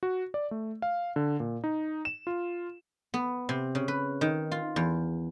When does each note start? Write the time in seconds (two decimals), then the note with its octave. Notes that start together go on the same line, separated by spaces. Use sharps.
0.03 F#4
0.34 D5
0.51 A3
0.82 F5
1.16 D3
1.40 A#2
1.64 D#4
2.05 E7
2.27 F4
3.14 B3
3.49 C3
3.75 C#3
3.88 B4
4.21 D#3
4.51 F4
4.76 E2